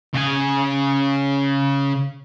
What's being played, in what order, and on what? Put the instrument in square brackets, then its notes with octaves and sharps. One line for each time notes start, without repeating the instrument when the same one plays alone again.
[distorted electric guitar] C#3 G#5